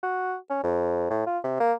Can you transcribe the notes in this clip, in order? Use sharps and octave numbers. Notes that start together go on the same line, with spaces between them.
F#4
C#4
F2
A2
F4
C3
A#3